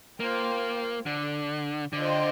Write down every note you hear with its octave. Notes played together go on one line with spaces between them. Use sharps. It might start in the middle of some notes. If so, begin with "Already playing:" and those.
A#3 F4 C5 G5
D3
D3 F4 C5 D#5 G5